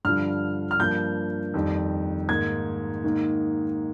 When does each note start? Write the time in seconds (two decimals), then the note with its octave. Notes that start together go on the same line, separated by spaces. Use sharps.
0.05 G2 D3 F3 F6
0.71 F6
0.79 G2 F3 A#3 G6
1.54 F2 D#3 G3
2.29 G#2 D#3 A#3 G#6
3.04 G#2 D#3 A#3